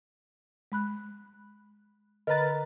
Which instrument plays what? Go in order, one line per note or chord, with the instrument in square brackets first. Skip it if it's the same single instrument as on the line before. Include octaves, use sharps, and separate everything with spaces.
[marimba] G#3 B5 F#6
[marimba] D3 [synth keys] A#4 B4 A6 [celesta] D#5 A#5